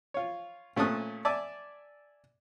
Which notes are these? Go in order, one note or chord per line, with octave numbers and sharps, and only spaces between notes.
F4 C#5
A#2 A3 C#4 A5 D#6 F#6
D5 E5 G#5 A5 D6